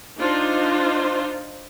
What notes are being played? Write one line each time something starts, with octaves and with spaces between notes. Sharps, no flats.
D4 D#4 F4 C5